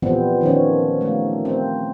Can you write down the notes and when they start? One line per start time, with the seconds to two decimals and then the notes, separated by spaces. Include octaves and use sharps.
0.02 A#2 E3 F3 G3 B3 C4
0.41 D#3 F3 C#4
1.01 A3 A#3
1.45 C4